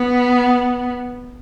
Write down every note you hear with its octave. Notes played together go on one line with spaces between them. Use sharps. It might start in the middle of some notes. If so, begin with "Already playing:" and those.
Already playing: B3